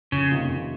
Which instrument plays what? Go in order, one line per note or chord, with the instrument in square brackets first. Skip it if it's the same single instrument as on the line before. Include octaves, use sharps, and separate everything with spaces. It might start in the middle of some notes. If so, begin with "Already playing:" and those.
[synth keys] F2 [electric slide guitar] C#3
[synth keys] C3 D#3 A#3 F4
F2